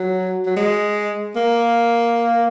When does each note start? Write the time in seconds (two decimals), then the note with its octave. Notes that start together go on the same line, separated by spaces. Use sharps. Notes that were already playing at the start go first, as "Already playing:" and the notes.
Already playing: F#3
0.46 F#3
0.56 G#3
1.36 A#3